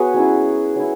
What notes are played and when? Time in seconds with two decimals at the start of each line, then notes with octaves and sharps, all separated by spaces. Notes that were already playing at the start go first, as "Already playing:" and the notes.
Already playing: B3 F#4 G#4 B4 C#5
0.14 F#3 C#4 E4
0.76 F#3 E4